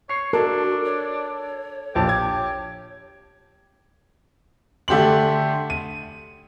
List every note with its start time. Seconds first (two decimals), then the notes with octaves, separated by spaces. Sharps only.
0.09 C#5 C7
0.33 D4 F#4 A4 A#4
0.85 C#5
1.95 A#1 F3 G4 A5
2.09 G#6
4.88 D3 A3 G4 C6 F#7
5.70 D#7